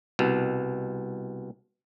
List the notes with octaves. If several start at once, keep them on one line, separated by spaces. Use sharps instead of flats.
C2 B2